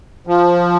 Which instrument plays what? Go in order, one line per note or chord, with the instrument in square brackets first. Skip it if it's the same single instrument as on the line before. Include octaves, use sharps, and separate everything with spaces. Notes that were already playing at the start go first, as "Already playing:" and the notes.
[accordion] F3